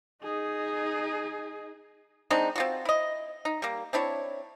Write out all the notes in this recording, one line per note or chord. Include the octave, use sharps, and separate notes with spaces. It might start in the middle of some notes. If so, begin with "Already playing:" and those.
D#4 G#4
G#3 C4 D4 D#4
C4 F4 F#4
E4 D#5
D#4
G3 A#3
C4 D4 E4 C#5